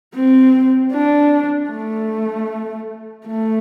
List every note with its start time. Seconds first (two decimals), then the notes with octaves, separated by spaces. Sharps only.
0.14 C4
0.92 D4
1.70 A3
3.26 A3